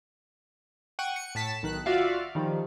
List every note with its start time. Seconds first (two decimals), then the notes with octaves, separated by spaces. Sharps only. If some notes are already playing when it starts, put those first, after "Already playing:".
0.99 F#5 G5 C#6 D#7
1.16 C#7
1.35 A2 A5 B6 E7
1.63 B1 D#3 F#6
1.86 F4 F#4 D5 E5 F5
2.35 D#3 F3 G3